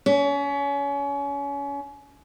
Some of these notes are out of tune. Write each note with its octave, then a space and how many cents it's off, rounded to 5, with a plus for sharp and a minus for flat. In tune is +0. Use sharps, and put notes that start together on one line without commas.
C#4 +30